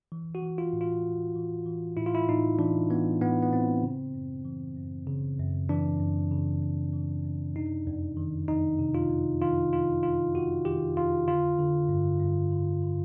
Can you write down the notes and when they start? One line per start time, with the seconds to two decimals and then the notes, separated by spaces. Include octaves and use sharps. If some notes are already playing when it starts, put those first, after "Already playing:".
0.12 E3
0.35 F#4
0.42 E3
0.58 F4
0.73 A2
0.81 F4
1.04 A2
1.36 E3
1.66 E3
1.97 A2 E4
2.06 F4
2.15 E4
2.28 A2 D#4
2.59 E3 D4
2.90 E3 B3
3.21 A2 B3
3.42 B3
3.52 A2 C4
3.83 C#3
4.14 F#2
4.45 E3
4.77 F#2
5.07 C#3
5.39 F#2
5.69 E3 D4
6.00 F#2
6.32 C#3
6.63 F#2
6.93 E3
7.25 F#2
7.56 C3 D#4
7.87 F2
8.17 D#3
8.48 F2 D#4
8.79 C3
8.95 F4
9.10 F2
9.42 D#3 F4
9.72 F2 F4
10.03 C3 F4
10.35 F2 F#4
10.65 D#3 G4
10.96 F2 F4
11.28 D3 F4
11.59 D3
11.89 G2
12.20 G2
12.51 D3
12.82 D3